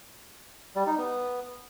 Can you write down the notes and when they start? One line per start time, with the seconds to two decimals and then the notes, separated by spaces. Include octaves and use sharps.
0.76 G3
0.87 D#4
0.98 B3